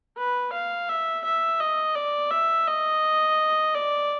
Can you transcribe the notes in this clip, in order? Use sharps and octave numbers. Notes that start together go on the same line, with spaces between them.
B4
F5
E5
E5
D#5
D5
E5
D#5
D5